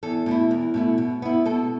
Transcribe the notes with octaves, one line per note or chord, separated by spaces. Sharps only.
E2 A4
B2 A3 E4
E2
B2 A3 E4
B2
B3 E4
B2 A4